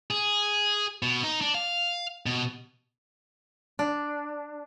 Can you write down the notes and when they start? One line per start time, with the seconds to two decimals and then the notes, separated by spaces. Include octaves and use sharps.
0.11 G#4
1.03 B2
1.23 D#4
1.41 D4
1.55 F5
2.26 B2
3.79 D4